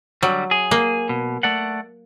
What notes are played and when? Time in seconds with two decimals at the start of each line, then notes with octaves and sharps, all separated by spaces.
0.23 D3 F#3 G3
0.51 G#4
0.71 A#3
1.09 B2
1.43 A3 D5 F#5